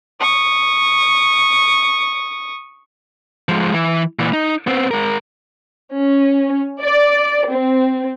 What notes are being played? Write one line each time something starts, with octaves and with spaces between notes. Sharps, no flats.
C#6 D#6
F3 G#3
E3
A#2 E3
D#4
B3 C4
G#3 A#4
C#4
D5
C4